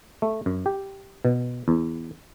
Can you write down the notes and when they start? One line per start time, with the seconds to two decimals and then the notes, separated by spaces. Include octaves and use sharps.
0.22 A3
0.46 F#2
0.66 G4
1.25 B2
1.68 E2